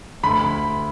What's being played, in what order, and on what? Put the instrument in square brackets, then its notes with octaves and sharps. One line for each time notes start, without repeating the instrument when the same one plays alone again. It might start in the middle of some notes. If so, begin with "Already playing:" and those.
[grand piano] D2 B5